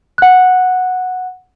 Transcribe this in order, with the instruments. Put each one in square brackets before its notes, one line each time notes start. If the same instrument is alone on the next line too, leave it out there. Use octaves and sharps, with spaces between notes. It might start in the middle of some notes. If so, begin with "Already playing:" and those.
[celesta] F#5 F#6